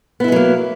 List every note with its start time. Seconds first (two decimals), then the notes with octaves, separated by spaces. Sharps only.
0.20 B3
0.24 E4
0.28 G#3
0.32 F#3
0.36 A#3